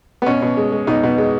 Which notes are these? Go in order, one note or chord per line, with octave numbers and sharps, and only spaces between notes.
B3
B2 C#4
B2
G#3
G#3
B2 D#4
B2
G#3